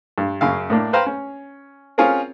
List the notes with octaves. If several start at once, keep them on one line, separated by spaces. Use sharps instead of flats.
G2
F#2 C#3 F5
A2 A#3 D4
B4 C5 F5 G5 A#5
C#4
C4 C#4 F4 G#4 A#4